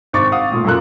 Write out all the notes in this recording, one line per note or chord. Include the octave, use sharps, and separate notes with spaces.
G#1 C4 C#6 D6 A6
F5 F#5 D#6
A#2 A3
F#2 A#2 A4 A#4 F#6